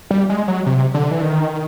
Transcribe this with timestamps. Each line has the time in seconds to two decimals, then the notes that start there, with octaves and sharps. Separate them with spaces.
0.11 G3
0.30 G#3
0.48 F#3
0.66 C3
0.94 D3
1.11 E3
1.22 D#3